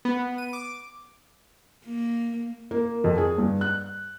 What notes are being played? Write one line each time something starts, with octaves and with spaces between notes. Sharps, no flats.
B3
D#7
D6
A#3
A#3
F2
G#4
G2
F#6